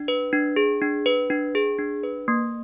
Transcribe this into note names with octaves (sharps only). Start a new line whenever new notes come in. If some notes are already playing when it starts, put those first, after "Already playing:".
Already playing: D4
B4
D4
G#4
D4
B4
D4
G#4
D4
B4
A#3